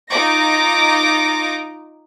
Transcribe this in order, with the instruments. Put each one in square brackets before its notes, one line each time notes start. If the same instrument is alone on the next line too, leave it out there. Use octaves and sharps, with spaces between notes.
[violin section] D#4 F4 D6 A#6